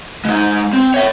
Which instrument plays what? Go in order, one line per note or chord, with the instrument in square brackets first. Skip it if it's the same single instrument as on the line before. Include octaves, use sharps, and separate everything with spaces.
[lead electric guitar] G#3 D#4
C4
C#5 E5